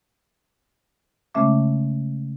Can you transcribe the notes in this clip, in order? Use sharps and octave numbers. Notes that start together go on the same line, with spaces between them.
C#3 G#3 A3 C#4 E5 D6